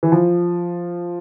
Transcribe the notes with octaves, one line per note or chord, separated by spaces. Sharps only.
E3
F3